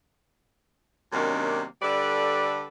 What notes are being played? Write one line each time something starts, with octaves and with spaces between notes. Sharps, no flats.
F#2 C3 D#3 A#3 C#4 D4
D3 G3 A4 B4 D5